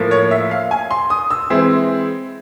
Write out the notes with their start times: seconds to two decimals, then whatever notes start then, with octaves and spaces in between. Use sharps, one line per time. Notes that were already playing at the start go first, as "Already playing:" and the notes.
Already playing: A2 F3 A#3
0.11 C#5
0.31 E5
0.51 F5
0.71 G#5
0.91 C6
1.10 D#6
1.30 E6
1.50 E3 G#3 C4 E4